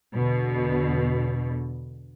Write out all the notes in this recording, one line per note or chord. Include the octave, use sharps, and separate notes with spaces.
E2 B2 D3